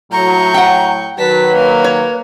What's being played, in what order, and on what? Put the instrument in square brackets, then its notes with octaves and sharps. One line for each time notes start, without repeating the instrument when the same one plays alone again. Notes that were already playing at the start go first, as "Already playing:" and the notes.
[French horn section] A2 F#3 [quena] A#5 [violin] C#6 G6
[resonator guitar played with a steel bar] F#5 G5
[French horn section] D#3 F#3 [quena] B4 [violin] A5 B6
[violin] A#3
[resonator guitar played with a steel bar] C#5